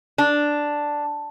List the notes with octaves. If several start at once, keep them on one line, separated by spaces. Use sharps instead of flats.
D4